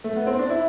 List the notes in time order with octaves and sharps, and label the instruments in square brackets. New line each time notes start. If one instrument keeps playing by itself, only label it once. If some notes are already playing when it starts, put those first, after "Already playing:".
[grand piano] A3
B3
C4
D4
E4